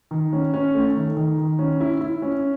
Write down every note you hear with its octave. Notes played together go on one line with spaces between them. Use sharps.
D#3
C#4
C#4
A3
D#3
D#3
D#3
C#4
E4
E4
C#4